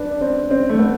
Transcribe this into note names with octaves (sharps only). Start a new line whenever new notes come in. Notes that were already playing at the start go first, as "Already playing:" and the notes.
Already playing: D4 B4
D4
C4
C4
A3
B3